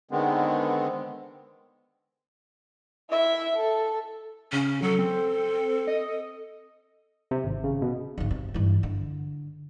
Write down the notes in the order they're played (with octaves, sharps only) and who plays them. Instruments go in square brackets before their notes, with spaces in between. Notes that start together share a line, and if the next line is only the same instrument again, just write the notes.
[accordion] D3 D#3 G#3 B3 C4
[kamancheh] E4 E5
A4
[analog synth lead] C#3 [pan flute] C#4
[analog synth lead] F#3 [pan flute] A4
[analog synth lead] C4
D#5
[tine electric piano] C3
G#1
C#3
B2
[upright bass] G#1 C#3
C3
G2 E3
D3